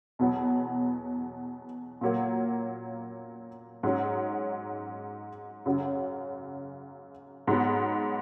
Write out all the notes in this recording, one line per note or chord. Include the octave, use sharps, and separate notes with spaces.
E2 B2 F#3 B3
A#2 F#3 A#3
G#2 F#3 C#4
F#2 C#3 F#3
G#2 F#3 B3